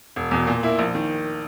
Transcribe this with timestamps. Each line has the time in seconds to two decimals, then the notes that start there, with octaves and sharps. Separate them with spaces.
0.16 E1
0.31 E2 B2
0.47 A#2
0.63 A#3 E4
0.79 A#1
0.95 D#3